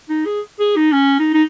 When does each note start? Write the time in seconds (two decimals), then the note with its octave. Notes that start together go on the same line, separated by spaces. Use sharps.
0.09 D#4
0.25 G#4
0.59 G#4
0.76 D#4
0.92 C#4
1.19 D#4
1.34 D#4